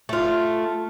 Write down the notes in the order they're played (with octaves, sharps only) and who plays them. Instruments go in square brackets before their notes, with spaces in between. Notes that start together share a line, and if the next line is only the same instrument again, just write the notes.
[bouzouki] A3 F4